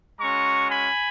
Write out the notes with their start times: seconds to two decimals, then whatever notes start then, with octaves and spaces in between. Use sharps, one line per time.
0.21 G#3 C#4 F#4 A#5 C#6
0.70 G#5 B5